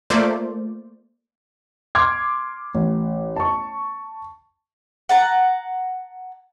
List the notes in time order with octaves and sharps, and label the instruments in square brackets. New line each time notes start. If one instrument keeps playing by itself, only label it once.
[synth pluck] A3 A#3 F4 C5 D5
[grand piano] C6 D6 F6 G#6
A1
A5 C#6
[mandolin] F#5 A5 A#5